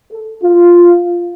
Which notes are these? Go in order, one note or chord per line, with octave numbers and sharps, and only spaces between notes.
A4
F4